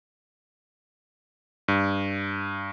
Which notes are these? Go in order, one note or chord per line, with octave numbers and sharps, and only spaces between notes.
G2